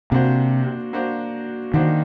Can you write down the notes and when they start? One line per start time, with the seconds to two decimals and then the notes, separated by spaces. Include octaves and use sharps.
0.11 C3 A#3 D4 F#4 C5
0.93 A#3 D4 F#4 C5
1.74 D#3 A#3 D4 F#4 C5